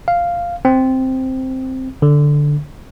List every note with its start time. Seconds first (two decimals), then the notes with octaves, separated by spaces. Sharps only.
0.08 F5
0.65 C4
2.02 D3